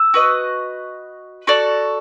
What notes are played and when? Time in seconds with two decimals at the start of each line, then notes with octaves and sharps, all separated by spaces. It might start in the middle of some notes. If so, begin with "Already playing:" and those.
Already playing: E6
0.14 F#4 B4 D#5
1.47 F#4 A4 D5